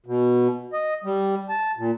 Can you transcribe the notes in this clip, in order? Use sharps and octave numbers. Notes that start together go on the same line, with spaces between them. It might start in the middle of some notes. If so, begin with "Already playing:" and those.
B2
D#5
G3
A5
A#2